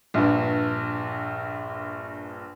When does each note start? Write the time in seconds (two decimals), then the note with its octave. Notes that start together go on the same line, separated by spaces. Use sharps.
0.14 A#1 G2